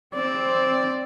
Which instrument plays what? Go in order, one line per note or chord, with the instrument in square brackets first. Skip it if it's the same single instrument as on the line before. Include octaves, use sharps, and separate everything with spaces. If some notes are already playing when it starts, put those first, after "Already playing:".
[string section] C4 [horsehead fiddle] D5